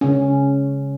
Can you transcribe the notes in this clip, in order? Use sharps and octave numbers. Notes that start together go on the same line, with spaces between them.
C#3 C#4